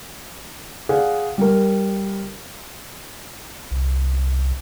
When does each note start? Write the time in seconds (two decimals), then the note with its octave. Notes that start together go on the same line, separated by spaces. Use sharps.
0.89 G#4 D5 F5 F#5
1.38 G3 A#4
3.71 C2